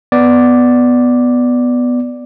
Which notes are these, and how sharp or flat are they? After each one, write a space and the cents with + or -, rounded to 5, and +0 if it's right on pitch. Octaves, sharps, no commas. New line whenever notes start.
B3 +5 D5 +0